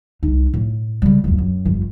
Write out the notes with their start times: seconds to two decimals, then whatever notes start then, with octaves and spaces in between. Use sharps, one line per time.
0.23 C2 D#4
0.54 A2
1.02 C#3 G3
1.24 D1 F2
1.38 F#2
1.65 G1 F2